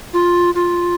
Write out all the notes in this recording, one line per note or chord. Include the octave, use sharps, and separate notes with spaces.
F4
F4